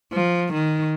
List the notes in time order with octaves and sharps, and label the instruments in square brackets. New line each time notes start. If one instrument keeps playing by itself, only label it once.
[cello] F3
D#3